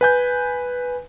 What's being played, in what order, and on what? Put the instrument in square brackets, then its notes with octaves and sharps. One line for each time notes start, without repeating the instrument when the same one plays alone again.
[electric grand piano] B4 G#5 G6